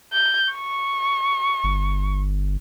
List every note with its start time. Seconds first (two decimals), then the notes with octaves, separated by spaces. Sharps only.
0.13 G6
0.53 C#6
1.64 G1